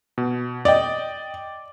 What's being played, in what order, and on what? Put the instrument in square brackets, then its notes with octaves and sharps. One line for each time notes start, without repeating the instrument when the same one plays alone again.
[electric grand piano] B2
[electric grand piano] D5 G5 [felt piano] D#5